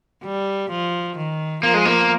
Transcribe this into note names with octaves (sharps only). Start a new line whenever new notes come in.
G3
F3
D#3
F3 A#3
G#3
A#3